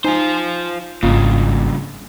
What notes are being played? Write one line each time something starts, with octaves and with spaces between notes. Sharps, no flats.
D#4 F4 C5 G#5
G#1 G2 C#3 A#3 F4 D#5